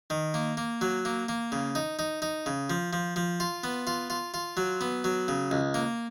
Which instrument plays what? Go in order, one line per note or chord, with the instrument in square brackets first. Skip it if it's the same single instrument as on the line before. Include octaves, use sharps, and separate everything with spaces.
[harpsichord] D#3
A#3
A#3
F#3
A#3
A#3
C#3
D#4
D#4
D#4
C#3
F3
F3
F3
F4
B3
F4
F4
F4
F#3
B3
F#3
C#3
C#2
A#3